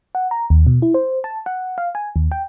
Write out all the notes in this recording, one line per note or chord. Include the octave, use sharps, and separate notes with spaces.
F#5
A#5
D#2
B2
E4
C5
A5
F#5
F5
G#5
D#2
G5